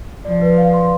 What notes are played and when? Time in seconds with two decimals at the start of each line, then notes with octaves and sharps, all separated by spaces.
0.25 F3 D5
0.42 B4
0.58 F5
0.74 C6